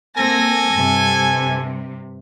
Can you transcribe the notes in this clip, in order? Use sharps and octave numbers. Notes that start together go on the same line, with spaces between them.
A#3 C4 A4 G#5 A#6
G2 C3